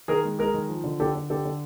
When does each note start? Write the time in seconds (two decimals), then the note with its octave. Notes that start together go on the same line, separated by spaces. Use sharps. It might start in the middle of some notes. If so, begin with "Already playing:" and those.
0.08 D#3 G#4 A#4
0.24 G#3
0.39 G#3 G#4 A#4
0.54 D#3
0.69 F3
0.84 D3
1.00 D3 G4 A4
1.15 D3
1.30 D3 G4 A4
1.45 D3